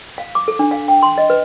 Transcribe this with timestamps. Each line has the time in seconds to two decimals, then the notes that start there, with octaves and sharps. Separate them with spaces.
0.18 F5
0.35 D6
0.48 A4
0.59 D4
0.71 F5
0.88 G5
1.03 C6
1.18 D#5
1.30 B4